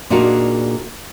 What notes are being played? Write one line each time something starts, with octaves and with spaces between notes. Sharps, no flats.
A#2 D4 D#4 F#4 G#4 A#4